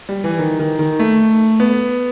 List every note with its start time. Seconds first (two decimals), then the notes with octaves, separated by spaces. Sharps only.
0.09 G3
0.24 E3
0.39 D#3
0.59 D#3
0.79 D#3
0.99 A3
1.60 B3